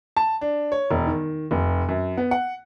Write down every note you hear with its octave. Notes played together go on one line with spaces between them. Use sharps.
A5
D4
C#5
E1
D#3
F1
F#2
B3
F#5